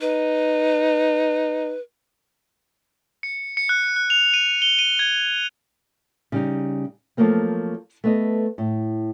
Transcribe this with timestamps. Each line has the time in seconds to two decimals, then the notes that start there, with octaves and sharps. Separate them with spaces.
0.01 D#4 B4
3.23 C#7
3.57 C#7
3.69 F#6
3.96 F#6
4.10 F7
4.34 D#7
4.62 G7
4.79 D#7
4.99 G#6
6.32 C#3 G3 D#4
7.17 F3 F#3 A3 A#3 C4
8.04 A3 B3 D#5
8.58 A2